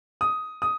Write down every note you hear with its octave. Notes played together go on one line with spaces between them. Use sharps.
D#6
D#6